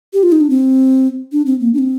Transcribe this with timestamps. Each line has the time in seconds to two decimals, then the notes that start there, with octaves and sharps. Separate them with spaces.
0.13 G4
0.23 F4
0.32 D#4
0.41 D4
0.50 C4
1.32 D4
1.46 C4
1.60 A#3
1.74 D4
1.79 C4